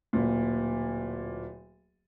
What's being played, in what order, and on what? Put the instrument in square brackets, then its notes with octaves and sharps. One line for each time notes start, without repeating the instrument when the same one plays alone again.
[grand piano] D1 A#2